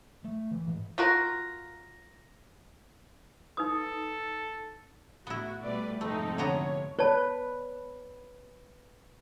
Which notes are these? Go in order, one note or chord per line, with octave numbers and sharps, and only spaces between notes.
A3
E3
G#2
F4 F#4 A#4
D#4 A4 B4 D#6
A2 B3 E4 F#4
B2 G3 A3 B4 D5
F2 G#2 C3 A3 C4 D#4 A4
D3 B3 C#5 A#5
B4 C#5 D5 A5